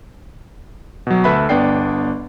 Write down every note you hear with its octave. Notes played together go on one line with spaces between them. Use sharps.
B2 F#3
D2 A4 B4 E5 B5
G1 B3 D4 D5 G5 C7